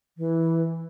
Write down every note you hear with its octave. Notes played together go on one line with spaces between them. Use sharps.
E3